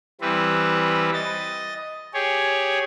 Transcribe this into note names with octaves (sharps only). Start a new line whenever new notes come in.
E3 G3 C4 B4
D#5 A6
G4 G#4 C#5